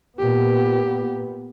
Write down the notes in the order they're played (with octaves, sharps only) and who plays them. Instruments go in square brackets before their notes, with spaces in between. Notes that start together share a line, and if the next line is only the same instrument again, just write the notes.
[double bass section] A#2 B3 [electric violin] G4